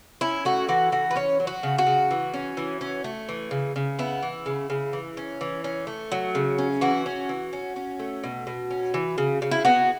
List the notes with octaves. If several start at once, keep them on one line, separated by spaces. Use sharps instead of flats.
C#4 E4
A3 F#4
E3 F#4
E3 F#4
B4
C#4 C#5
F#3
F#4
C#3
F#4
C#3
E3
C#4
E3
C#4
A3
E3
C#3
C#3
B3 E4
E3
C#3
C#3
E3
C#4
E3
C#4
A3
F#3
C#3
C#4
E3 F#4
C#4
E3
C#4
C#4
A3
B2
B2
C#4
E3
C#3
C#3
E4
B3 F#4